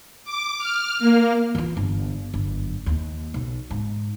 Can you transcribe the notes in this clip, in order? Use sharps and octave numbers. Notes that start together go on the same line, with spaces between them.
D6
F6
A#3
E3 F4
G1
G1 F#2
D#2
B1
G#2